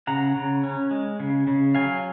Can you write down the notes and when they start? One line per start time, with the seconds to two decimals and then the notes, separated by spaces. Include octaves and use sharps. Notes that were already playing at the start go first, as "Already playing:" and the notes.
0.07 C#3 F#5 A#5
0.35 C#3
0.64 C#4
0.91 G#3
1.20 C#3
1.47 C#3
1.75 F#3 F5 G#5